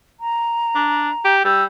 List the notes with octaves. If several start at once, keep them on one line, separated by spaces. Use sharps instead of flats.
A#5
D4
G4
G3 E6